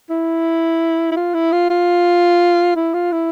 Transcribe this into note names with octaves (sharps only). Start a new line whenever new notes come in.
E4
E4
F4
E4
F4
F4
E4
F4
E4